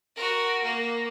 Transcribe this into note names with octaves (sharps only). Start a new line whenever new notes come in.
F#4 A#4
A#3